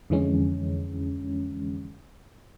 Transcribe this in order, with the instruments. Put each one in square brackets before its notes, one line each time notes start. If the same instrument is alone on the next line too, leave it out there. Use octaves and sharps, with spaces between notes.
[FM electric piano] F2 D3 E3 G#3 C#4